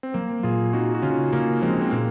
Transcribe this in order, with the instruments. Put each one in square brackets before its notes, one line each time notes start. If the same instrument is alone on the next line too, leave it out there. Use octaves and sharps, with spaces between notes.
[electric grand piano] C4
[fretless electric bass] F#3 [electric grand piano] A#3
[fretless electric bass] A#2 [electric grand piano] F4 G#4
[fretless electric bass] C4 [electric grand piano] D#4 F#4
[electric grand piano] F#4
[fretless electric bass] C#3 [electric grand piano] C#4 F4
[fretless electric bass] C#3 [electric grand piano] A#3 C#4
[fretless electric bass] F3 [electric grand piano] G#3 C4
[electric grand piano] C4
[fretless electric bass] A#2 [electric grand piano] A#3